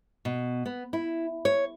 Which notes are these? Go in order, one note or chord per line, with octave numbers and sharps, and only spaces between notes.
B2
B3
E4
C#5